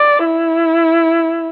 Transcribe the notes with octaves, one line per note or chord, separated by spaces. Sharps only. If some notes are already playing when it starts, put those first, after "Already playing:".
Already playing: D5
E4